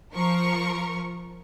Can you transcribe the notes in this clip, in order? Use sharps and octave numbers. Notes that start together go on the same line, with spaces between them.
F3 A#4 C#6